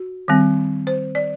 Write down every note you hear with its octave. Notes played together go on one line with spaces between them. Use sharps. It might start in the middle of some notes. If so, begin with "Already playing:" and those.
Already playing: F#4
D#3 G3 C4
C5
D5